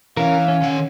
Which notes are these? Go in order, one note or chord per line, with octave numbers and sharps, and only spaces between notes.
E3 C#4 A#4 F5
C#4
D#3 F#5